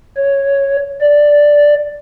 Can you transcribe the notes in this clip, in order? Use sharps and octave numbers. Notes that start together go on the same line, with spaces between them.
C#5
D5